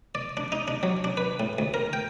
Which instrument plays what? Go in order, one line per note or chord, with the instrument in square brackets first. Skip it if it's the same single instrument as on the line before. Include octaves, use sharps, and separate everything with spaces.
[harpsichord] D5
D4
D#4
D4
F#3
D4
B4
A2
D2
A#4
G5